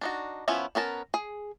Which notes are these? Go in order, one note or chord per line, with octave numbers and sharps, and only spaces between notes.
D4 D#4 F#4
F3 B3 C#4 E4
B3 C#4 A#4 A5
G#4